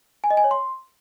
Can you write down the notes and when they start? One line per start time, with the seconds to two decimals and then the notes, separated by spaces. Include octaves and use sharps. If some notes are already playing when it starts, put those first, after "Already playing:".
0.24 G#5
0.30 D#5
0.37 G#5
0.44 C#5
0.51 C6